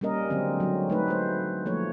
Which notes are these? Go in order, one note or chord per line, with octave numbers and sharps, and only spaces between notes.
G3 A#3 C#4 A#4 D#5
D3 F#3 G#3 C4
F#3 G#3
A3 D#4 B4
A3 C5
F3 A3 A#3 C#5